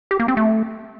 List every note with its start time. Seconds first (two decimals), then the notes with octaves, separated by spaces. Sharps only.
0.11 G4
0.20 A#3
0.28 C4
0.37 A3